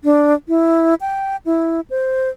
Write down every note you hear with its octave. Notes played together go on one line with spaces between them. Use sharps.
D4
E4
G5
E4
C5